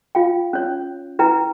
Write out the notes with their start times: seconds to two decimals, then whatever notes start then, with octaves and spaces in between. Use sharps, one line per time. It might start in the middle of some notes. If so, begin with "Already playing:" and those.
0.15 F4 F5 G5
0.53 C#4 C#5
1.19 E4 B4 G5 A#5